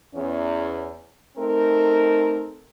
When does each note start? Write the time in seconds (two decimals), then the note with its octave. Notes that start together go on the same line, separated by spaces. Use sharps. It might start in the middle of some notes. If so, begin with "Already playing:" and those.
0.14 E2 C#4
1.38 A3 C4 D#4 A#4